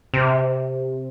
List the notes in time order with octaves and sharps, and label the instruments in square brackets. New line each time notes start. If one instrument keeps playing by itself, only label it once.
[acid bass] C3